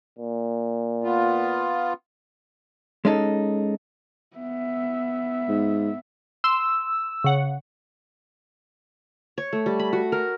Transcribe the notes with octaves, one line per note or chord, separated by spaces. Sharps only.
A#2
B3 F4
G#3 C#4 D#4 A4
B3 E5
G#2
C6 E6
C#3 F#5
C#5
A3
G3
B5
F#4
A#4